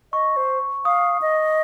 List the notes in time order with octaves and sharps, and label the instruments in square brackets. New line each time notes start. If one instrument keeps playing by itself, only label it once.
[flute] D#5 [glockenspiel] C#6
[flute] C5
[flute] F5 [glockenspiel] D#6
[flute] D#5